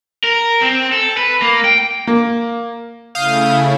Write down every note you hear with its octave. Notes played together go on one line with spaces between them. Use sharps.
A#4
C4
A4
B4
A#3
G5
A#3
C#3 A3 E4 F5 D#6 G6